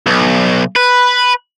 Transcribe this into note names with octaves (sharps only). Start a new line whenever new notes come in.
B1
B4